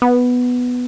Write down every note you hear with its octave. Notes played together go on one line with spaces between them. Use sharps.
B3